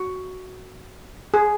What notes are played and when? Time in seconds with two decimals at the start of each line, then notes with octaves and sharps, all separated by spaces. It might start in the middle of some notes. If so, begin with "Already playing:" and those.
Already playing: F#4
1.34 G#4